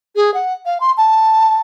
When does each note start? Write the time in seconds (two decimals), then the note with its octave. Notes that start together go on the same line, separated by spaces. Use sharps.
0.16 G#4
0.34 F#5
0.66 F5
0.80 C6
0.97 A5